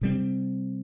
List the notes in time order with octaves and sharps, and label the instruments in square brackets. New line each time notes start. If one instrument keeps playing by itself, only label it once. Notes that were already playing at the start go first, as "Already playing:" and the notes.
[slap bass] C3 G3 C4